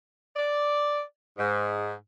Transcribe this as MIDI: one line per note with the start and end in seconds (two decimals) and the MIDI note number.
0.36 1.00 74
1.38 1.92 44